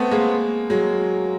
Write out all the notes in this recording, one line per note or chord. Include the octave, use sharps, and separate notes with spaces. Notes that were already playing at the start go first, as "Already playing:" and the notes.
Already playing: A3 B3 C4
G#3 A#3
F#3 G#3